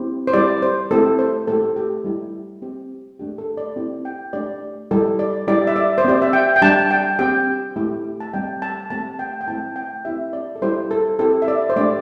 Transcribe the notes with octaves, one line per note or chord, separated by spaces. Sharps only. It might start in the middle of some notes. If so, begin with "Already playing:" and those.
Already playing: C4 E4 G4
C5
G3 C4 E4 G4 D5
C5
A3 C4 E4 G4 A4
C5
A3 E4 G4 A4
G4
G3 E4 G4
C4 G4
A3 D4 G4
A4
D5
C4 E4 G4
G5
A3 D4 G4 D5
G3 E4 G4 A4
D5
G3 E4 G4 D5
E5
D5
C5
C4 G4 D5
E5
G5
G5
G3 D4 G4 A5
G5
C4 G4 G5
A3 E4 G4
A5
G3 C4 G4 G5
A5
A3 C4 G4 A5
G5
G5
A3 C4 E4 A5
G5
C4 E4 G4 E5
D5
A4
G3 E4 G4 C5
A4
C4 E4 G4 A4
E5
D5
C5
A3 D4 G4 D5